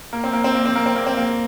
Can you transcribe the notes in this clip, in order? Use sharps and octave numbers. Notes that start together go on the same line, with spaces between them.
A#3
C4
A#3
C4
A#3
C4
A#3
C4
A#3
C4
A#3